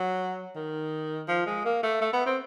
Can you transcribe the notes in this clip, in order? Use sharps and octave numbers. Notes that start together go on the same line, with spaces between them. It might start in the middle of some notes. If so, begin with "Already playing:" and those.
Already playing: F#3
D#3
F3
G#3
A#3
A3
A3
B3
C4